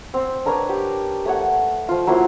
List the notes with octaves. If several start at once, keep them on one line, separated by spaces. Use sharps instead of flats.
C4
D4 A#4 B4 C#5
G4
A3 C#5 F#5
F3 F4
F#3 A#3 E4 C5